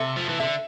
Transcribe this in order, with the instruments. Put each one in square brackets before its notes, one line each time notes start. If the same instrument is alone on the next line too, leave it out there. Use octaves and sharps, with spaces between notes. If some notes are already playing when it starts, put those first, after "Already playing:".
Already playing: [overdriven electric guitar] C3 [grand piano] A4 E5
[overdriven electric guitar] F3
E3
[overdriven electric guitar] D3 [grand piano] E5